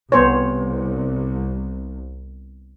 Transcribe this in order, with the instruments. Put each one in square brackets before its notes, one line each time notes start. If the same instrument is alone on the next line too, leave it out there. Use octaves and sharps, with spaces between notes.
[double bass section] C2 [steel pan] B3 C5 C#5